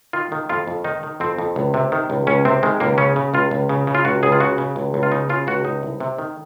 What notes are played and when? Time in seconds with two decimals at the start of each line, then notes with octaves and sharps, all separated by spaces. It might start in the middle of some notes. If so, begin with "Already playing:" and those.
0.13 D#3 F4
0.32 D#3
0.49 F2 F4
0.67 F2
0.84 D#3 D#4
1.03 D#3
1.20 F2 C4
1.38 F2
1.56 C#2
1.74 C3
1.92 D#3
2.10 C#2
2.27 C#2 C#4
2.45 C3 C4
2.63 D#3 G#3
2.80 C#2 A#3
2.98 C#3 C#4
3.16 C#3
3.34 C#2 F4
3.51 C#2
3.69 C#3
3.87 C#3
3.95 F4
4.05 C#2 F#4
4.23 C#2 G#4
4.32 F4
4.40 C#3 F#4
4.58 C#3
4.76 C#2
4.94 C#2
5.03 F4
5.12 C#3 D#4
5.29 C#3 F4
5.47 C#2 F#4
5.65 C#2 D#4
5.83 C2
6.00 C3
6.18 D#3